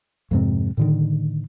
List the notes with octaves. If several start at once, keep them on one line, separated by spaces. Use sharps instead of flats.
F2 G#2 C3
A2 D3 D#3